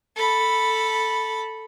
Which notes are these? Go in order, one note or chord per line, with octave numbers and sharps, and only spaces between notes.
A4 B5